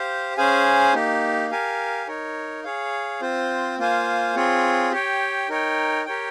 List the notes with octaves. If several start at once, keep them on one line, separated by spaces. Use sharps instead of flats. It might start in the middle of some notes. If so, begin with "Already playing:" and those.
Already playing: G4 C5 F5
C#4 G#4 C5 F5 G#5
A#3 D#4 G4
G4 A#4 F5 G#5
D#4 A#4 C#5
G#4 C#5 F5
C4 F4 C5
A#3 F4 C5 F5 G#5
C4 F4 G#4 C#5
G4 C#5 G5
D#4 A#4 C#5 G5
G4 A#4 C#5 G5